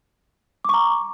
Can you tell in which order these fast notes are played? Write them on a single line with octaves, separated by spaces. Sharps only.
D6 C#6 A#5